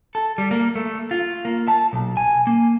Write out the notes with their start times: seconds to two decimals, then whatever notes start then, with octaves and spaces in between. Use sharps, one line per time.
0.15 A4
0.38 G3
0.51 A#3
0.75 A3
1.11 F4
1.45 A#3
1.68 A5
1.93 B1
2.17 G#5
2.47 A#3